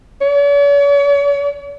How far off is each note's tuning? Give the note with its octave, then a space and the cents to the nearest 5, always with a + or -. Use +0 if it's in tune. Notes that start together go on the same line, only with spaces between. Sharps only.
C#5 +45